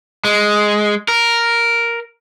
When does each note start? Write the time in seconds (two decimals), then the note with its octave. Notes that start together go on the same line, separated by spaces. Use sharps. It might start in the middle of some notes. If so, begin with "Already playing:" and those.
0.25 G#3
1.08 A#4